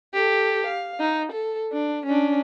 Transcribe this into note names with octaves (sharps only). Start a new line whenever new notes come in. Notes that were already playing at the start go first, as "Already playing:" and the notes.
G4 A4
F5
D#4
A4
D4
C#4 D4